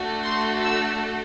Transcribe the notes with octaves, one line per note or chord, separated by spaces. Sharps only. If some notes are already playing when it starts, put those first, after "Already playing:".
Already playing: A3 D4 F#4 A4
C6
E6